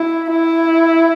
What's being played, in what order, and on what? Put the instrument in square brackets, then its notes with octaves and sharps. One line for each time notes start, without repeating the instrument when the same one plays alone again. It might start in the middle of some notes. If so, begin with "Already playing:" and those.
Already playing: [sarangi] E4
E4